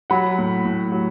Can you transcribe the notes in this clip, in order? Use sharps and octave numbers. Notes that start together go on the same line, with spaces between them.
F#3 F#5 B5
A2
A2
F#3